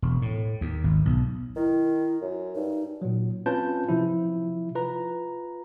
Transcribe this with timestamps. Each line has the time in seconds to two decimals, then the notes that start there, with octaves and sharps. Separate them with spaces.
0.02 E1
0.22 A2
0.61 D#2
0.84 G#1
1.05 B1
1.56 D#3 E4
2.22 F#2
2.56 G2 D#4
3.02 A#2 F#3
3.46 C4 C#4 F4 B4 A5 G6
3.89 C3 F3 E4
4.75 F4 B4 A#5